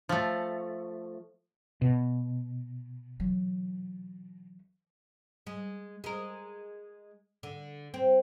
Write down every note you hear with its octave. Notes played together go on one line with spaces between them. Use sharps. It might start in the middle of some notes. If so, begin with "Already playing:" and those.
F3 A3
B2
E3 F#3
G#3
G#3 A#4
D3
C4